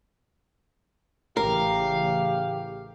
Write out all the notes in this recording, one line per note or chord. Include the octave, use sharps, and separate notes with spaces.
A1 C#3 E3 G4 A#4 F5